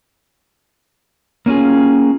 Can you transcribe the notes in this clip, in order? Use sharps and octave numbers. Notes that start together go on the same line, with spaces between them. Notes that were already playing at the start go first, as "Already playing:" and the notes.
A#3 C#4 F4 G#4